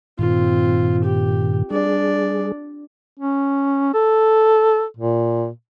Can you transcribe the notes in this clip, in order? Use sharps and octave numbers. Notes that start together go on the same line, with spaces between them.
G2 A#2 D#3 C4 F4
G4
G3 D4 G#4 D5
C#4
A4
A#2